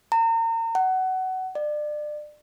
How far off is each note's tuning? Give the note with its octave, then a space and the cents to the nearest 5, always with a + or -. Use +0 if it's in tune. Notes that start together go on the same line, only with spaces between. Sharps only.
A#5 -35
F#5 +20
D5 +30